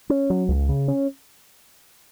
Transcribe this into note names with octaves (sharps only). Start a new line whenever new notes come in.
C#4
F#3
C#2
C#3
C#4